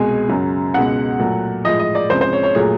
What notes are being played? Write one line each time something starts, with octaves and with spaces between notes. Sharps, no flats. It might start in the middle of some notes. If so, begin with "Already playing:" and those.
Already playing: C2 B2 G#3 G#5
F#2 C#3 F#3
C#2 B2 G#3 F#5
A#2 F#3 A3
A2 F3 G#3 D#5
D#5
D5
C#2 C3 F3 G#3 C5
C5
C#5
C#5
A#2 F#3 A3 G#4